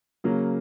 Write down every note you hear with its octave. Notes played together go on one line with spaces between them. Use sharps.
C#3 F#3 A#3